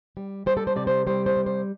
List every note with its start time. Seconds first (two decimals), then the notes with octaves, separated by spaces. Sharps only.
0.17 G3
0.46 G3 C5
0.57 A4
0.67 C5
0.76 C3 D5
0.87 C5
1.07 G3 C5
1.26 C5
1.37 C3
1.46 C5